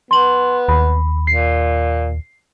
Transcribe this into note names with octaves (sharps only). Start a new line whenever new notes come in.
B3 C6 F#7
D#2 B5
A#2 C7